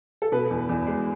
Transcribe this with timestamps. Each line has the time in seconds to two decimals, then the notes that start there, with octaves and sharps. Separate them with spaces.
0.22 A4
0.32 B2 B4
0.50 E2
0.69 E2
0.87 G#3